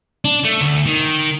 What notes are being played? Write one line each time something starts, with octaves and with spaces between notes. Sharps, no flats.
D4
A3
D2
D#3